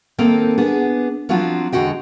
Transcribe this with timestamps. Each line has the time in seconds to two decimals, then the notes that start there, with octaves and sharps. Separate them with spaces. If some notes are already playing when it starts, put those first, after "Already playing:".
0.18 D#3 A#3 C4 D#4 A4
0.58 B3 D4 G#4
1.29 F3 F#3 C4 D4 F4 F#4
1.72 E2 D3 G#3 F#4 D#5 G5